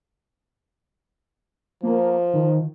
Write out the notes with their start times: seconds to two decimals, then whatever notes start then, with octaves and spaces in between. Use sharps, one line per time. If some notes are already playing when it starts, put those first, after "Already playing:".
1.83 F3 A#3
2.34 D#3